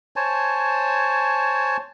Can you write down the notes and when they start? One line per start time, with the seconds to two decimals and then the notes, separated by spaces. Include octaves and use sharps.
0.16 C5 C#5 G#5 A5